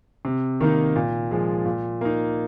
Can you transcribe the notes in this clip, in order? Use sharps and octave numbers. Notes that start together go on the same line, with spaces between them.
C3
D#3 A#3 D#4
A#2
F3 G#3
A#2
A#3 D#4